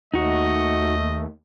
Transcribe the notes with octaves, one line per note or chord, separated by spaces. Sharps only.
D#2 A3 D#4 F#4 D#5